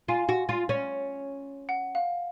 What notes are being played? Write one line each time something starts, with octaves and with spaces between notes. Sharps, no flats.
F4 F5 G#5
F#4
F4
C#4
F#5
F5